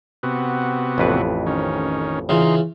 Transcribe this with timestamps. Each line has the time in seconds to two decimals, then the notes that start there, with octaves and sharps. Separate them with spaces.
0.23 C3 B3 F#4
0.98 A1 F2 B4
1.47 D#3 C#4
2.29 C#3 E3 D#4 F4 C6